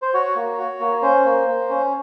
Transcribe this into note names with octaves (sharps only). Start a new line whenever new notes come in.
C5
F#4 C#5
A#3
F#4
A#3
C#4 C5
A#3
A#3
C#4